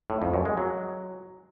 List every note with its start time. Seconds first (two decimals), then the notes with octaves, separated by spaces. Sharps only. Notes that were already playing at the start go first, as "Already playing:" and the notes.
0.10 A2
0.22 F2
0.34 F#2
0.45 G#3
0.57 F#3